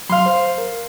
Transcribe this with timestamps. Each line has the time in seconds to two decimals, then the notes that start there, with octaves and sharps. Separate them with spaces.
0.09 F#3 F5 C6
0.26 C5
0.58 A#4